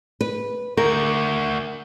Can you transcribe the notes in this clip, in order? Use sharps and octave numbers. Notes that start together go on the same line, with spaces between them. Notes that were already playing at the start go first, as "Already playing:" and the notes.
B4
D2 A#4